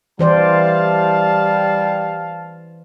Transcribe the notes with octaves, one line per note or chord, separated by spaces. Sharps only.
E3 G3 C5 D5 F5 A5